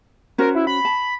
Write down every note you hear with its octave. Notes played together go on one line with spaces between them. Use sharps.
C#4 F#4 A#4 C5
E4
B5
A5